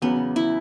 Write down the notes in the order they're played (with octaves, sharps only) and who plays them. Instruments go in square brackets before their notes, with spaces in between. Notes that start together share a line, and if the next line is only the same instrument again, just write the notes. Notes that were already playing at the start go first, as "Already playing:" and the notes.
[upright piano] E2 C#3 F#3 [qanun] B3
[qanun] E4